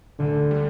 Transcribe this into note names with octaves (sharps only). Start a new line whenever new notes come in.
D2 D3
D3 G3